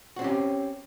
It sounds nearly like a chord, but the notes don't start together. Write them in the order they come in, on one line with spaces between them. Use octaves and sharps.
F#4 C4 C#4 G4